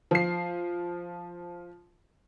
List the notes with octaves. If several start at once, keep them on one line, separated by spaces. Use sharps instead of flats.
F3 C7